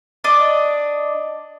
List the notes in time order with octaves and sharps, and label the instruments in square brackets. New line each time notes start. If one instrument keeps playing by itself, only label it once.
[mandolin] D4 D#5 D6